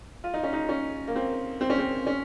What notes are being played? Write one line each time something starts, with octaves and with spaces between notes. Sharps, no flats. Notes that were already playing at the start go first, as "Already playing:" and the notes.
F4
D#4
C#4
D#4
C#4
A#3
C4
C4
C#4
C4
C#4